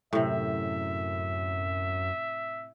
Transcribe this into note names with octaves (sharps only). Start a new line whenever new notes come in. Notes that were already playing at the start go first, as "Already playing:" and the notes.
F#2 A2 C3 E5